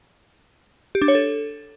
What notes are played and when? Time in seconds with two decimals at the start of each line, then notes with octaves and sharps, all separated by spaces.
0.95 G4
1.02 D4
1.08 C#5
1.15 A4